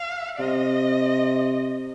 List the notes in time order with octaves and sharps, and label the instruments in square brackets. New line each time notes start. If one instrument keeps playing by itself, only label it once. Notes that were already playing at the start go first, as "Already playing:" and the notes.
Already playing: [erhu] F5
[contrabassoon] C3 [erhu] D#5